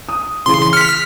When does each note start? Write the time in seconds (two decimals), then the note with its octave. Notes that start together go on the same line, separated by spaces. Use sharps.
0.09 D#6
0.46 C#3 E3 G#4 C6
0.73 F6 B6 C#7